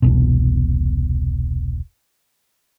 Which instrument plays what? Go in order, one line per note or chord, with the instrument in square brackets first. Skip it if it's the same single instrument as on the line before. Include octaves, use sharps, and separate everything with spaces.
[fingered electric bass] E1 C2 B2